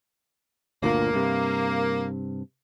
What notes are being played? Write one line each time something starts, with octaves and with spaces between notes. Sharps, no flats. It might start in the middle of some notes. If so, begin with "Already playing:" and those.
G1 D2 A#2 A#3
G2 C3